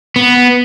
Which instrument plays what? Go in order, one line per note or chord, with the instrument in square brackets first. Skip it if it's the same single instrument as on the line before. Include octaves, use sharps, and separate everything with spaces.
[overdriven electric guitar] B3